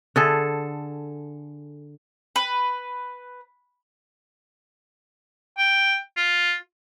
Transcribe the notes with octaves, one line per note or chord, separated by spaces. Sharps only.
D3 G#4 A4
B4
G5
F4